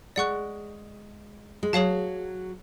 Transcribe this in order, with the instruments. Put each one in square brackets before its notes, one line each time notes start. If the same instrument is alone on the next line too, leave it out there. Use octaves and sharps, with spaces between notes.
[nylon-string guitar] G#3 [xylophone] D5 F#5 C#6 F#6
[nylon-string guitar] G#3
[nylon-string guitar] F#3 [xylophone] G#4 C#5 F5 A5